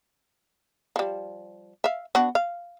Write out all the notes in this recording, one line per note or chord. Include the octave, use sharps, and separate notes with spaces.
F3 G3
E5 F5
B3 D4 F#4
F5